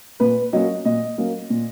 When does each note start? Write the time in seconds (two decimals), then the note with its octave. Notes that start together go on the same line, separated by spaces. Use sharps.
0.20 A#2 B4
0.53 F#3 A#3 C#4 D#5
0.85 A#2 D#5
1.18 F#3 A#3 C#4
1.50 A#2